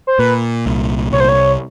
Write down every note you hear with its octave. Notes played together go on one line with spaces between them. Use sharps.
C5
A#2 B4
C2
C2 C#5
C5
C#5